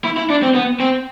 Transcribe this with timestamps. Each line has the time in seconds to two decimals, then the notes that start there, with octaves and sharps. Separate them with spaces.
0.04 E4
0.17 E4
0.30 D4
0.43 C4
0.55 B3
0.80 C4